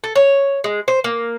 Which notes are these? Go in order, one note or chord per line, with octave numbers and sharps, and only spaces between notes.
A4
C#5
G#3
C5
A#3